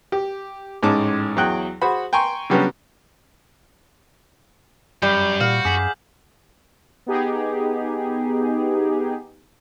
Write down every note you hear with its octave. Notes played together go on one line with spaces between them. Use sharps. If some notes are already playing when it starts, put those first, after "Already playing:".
G4
A1 G#2 G#3 C#4 A5 D6
E2 F#3 G#4 G5 F#6
F#4 G#4 C5 F#5 B5
G5 G#5 A#5 C6 C#6
C#3 F#3 G3 B3 C#4 D4
F#2 G3 G6
A#2 F#4 F5 F#5
F#2 G#4 D6 B6 F#7
B3 D#4 G4 G#4